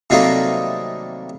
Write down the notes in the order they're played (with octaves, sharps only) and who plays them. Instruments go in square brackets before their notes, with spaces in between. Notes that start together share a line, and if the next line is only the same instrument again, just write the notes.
[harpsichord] C3 D#3 F#3 G3 A3 A#3